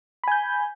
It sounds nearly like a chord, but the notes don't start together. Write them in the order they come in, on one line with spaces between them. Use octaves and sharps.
B5 G#5 G6